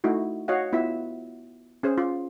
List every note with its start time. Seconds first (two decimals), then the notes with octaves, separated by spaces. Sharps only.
0.04 A3 D#4 E4 F#4
0.48 F#4 C#5 D#5 F5 F#5
0.73 B3 E4 F4 E5
1.83 C#4 G#4 C5
1.98 F4